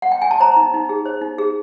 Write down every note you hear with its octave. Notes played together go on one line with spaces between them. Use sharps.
F#5
G5
G#5
A5
C5 A#5
D#4
D#4
G#4
C5
D#4
G#4